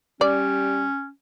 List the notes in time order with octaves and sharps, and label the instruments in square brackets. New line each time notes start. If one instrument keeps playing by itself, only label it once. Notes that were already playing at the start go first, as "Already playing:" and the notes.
[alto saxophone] G3 [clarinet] C#4 [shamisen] D5